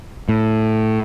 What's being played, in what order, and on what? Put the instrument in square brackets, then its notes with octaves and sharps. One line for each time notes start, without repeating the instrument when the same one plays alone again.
[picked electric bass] A2